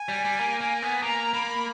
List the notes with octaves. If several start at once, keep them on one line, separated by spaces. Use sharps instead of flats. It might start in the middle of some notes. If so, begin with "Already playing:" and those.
Already playing: G#5
G3
G3
A#3
A#3
B3
A#3 A#5
A#3 B5